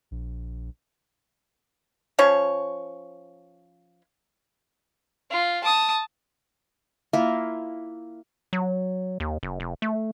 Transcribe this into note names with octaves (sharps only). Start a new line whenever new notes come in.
A#1
F3 C#4 C#5
F4
A5 D#6
A#3 E4 F4
F#3
D#2
F#1
F1
A3